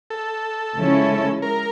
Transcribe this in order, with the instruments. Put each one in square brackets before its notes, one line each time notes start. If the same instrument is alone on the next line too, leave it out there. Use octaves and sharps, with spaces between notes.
[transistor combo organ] A4
[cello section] C#3 F3 G#3 C#4 E4
[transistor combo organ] A#4